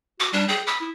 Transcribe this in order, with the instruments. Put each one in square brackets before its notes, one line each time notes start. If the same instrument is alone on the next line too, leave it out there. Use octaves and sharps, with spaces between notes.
[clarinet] F#4 [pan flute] D6
[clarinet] G3 [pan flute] D4
[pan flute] G#4 [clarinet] G5
[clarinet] B5 [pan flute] D#6
[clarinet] E4